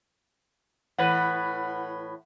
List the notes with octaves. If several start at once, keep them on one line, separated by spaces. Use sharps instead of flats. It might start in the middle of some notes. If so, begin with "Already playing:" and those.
A2 E3 B4 F#5